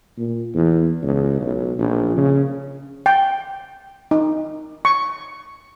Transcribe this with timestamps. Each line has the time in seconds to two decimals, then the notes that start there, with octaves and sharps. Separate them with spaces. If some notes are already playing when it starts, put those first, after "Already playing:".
0.18 A#2
0.55 E2
1.03 C#2
1.41 B1
1.79 A#1
2.17 C#3
3.06 G5
4.11 D#4
4.85 C#6